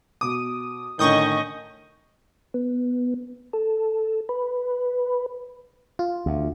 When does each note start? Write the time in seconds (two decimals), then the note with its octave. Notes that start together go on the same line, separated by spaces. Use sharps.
0.21 B2 D6 D#6
0.99 A2 D3 D#3 C#4 D#5 C#6 D#6 G6
2.54 B3
3.53 A4
4.29 B4
5.99 F4
6.26 D2